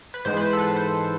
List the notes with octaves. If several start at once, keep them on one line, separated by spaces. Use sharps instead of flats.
B4
G#2 E3 G#3 B3 C5
B4
C5
A4
B4
B4
C5